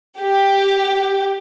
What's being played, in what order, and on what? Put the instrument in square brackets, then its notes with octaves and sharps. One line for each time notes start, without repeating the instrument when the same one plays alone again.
[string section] G4